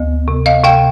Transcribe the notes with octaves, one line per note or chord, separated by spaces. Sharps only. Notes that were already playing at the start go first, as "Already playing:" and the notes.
Already playing: D2 B3
C3
D#5 F5
C3 F5 G5